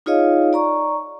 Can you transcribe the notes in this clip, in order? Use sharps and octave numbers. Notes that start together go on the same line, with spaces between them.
D#4 F4 G#4 C#5 D#5 F5
D5 A#5 C#6